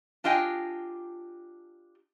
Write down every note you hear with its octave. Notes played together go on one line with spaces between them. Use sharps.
D4 F4 G4 D#5 G5 G#5